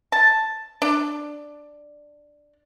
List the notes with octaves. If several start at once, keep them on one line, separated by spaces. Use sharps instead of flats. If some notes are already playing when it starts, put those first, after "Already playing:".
A5
D4